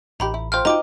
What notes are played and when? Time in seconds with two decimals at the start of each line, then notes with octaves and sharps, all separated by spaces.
0.20 A1 D#3 G4 A#5 B5
0.34 E4
0.52 A3 F4 C5 G5 F6
0.65 D#4 F4 F#4 C5 D#5 G5 A#5 D6